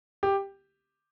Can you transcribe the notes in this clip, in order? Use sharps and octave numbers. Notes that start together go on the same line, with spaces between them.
G4